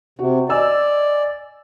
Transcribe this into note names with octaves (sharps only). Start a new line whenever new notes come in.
C3 F#4
D5 D#5 G#5 E6